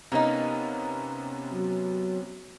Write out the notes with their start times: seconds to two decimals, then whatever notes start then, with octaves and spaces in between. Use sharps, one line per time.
0.12 C3 A#3 B3 C#4 D#4
1.53 F#3